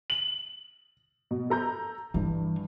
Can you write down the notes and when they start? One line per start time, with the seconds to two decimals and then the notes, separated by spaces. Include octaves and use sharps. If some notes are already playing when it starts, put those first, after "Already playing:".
0.10 F#7
1.31 B2
1.50 A4 A#5 G6
2.14 G2 E3